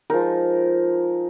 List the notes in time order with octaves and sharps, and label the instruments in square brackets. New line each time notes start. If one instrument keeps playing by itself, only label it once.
[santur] F3 G#3 D#4 A#4